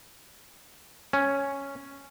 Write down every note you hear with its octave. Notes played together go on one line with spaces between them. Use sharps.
C#4